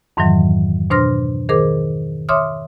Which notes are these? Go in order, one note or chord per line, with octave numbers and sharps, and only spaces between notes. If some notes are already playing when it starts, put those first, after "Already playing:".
F2 G#2 D#3 E3 F#3
B2 D4 C5 C6 F6 A#6
D#3 G#4 A#4 C5 D6
C#5 E5 C6 D6 D#6 F6